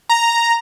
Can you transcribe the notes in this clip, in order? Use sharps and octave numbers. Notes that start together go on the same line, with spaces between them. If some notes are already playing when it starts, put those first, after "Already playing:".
A#5